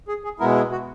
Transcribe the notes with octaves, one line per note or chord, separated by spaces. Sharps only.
G#4
G#4
B2 G#3 B3 E4 A#4
G#4
F#4